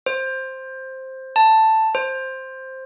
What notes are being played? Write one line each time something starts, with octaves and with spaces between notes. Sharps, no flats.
C5
A5
C5